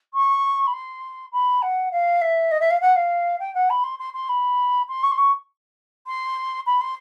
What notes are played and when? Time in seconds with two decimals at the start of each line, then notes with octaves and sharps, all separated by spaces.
0.14 C#6
0.67 B5
0.73 C6
1.32 B5
1.62 F#5
1.92 F5
2.21 E5
2.51 D#5
2.60 E5
2.70 F5
2.81 F#5
2.96 F5
3.39 G5
3.54 F#5
3.70 B5
3.84 C6
3.99 C6
4.14 C6
4.29 B5
4.88 C6
5.03 C#6
5.11 C6
5.17 C#6
6.07 C6
6.66 B5
6.81 C6